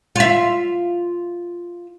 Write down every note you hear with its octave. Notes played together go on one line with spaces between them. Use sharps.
F4 E5